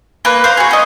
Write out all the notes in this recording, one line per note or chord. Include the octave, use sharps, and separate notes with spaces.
A#3 B4
C5 F5
F#4 G#4
C#4 D#5